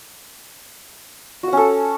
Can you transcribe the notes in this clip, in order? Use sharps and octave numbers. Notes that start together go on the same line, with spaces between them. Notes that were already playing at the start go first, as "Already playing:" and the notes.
C#4 F#4 A4 F#5